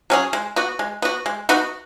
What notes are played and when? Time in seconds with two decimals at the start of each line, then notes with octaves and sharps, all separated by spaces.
0.10 F#3 C#4 G#4
0.33 G#3
0.56 B3 F#4
0.79 G#3
1.02 B3 F#4
1.26 G#3
1.49 B3 D#4 F#4